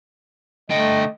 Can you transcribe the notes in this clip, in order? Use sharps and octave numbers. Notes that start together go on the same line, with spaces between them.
D3 A3 D#5 G5